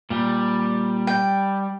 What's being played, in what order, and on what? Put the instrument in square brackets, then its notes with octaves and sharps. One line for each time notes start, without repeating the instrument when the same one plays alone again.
[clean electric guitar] A#2 [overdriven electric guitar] G3
[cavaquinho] G5